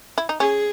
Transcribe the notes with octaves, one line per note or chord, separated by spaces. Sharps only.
E4
D#4
C#4 G#4